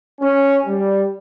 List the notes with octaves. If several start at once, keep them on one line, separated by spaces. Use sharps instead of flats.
C#4
G3